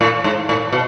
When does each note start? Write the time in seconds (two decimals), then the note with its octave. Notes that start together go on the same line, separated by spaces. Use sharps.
0.01 A2
0.24 G#2
0.49 A2
0.72 B2